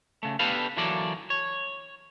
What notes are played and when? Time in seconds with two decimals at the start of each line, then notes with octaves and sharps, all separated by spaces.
0.23 C#3 A3
0.39 B3 D4 G4 A4 B4 F5
0.77 D3 E3 F#3 A#3 A4 D5
1.30 C#5